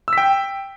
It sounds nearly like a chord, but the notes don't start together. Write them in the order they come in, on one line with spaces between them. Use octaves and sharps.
E6 B6 G5